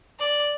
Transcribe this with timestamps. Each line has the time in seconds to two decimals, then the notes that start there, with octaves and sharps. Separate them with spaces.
0.19 D5